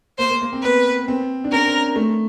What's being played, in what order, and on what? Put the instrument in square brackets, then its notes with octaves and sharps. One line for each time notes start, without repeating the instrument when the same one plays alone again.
[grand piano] A#3 [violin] C5
[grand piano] A#3
A#3
C4
[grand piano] B3 [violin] B4
[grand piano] C4
D4
[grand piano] C#4 [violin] A#4
[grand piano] C4
A3